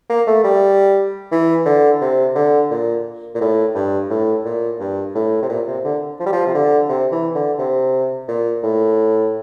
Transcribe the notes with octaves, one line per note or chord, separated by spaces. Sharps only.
A#3
A3
G3
E3
D3
C3
D3
A#2
A#2
A2
G2
A2
A#2
G2
A2
C3
A#2
C3
D3
F3
G3
F3
C3
D3
C3
E3
D3
C3
A#2
A2